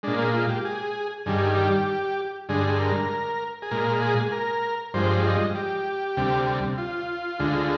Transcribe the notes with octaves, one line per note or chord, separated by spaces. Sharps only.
A#2 G#3 D4
A#3
F4
G4
G#4
G2 D#3 G3 G#4
G4
G2 D3 G#3 G#4
A#4
G#4
A#2 G#3 A#4
G#4
A#4
G2 F3 G#3 C5
D#5
G4
D2 C3 G3
F4
D2 D3 G#3